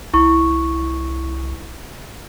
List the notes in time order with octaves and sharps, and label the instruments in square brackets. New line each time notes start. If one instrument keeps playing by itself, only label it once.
[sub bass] C2 [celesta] E4 C#6